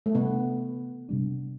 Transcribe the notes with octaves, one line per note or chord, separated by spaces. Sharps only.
A3
C3 G3 B3 D4
C3 G3 D4